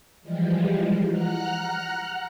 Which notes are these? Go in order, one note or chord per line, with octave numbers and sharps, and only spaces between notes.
E3 F3 G3 G#3
F#5 A#5 F6 F#6